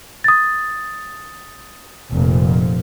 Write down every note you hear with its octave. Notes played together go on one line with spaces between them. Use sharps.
D#6 A6
F1 A#2 F3